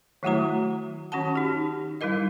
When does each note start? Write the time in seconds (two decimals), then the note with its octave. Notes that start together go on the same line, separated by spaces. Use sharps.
0.23 D#3 F#3 A3 E4 F#4 A#5
1.12 D#3 C#4 F#4 F#5 A5
1.35 D#4 G4
2.01 G3 D#4 E4 A#4 D#5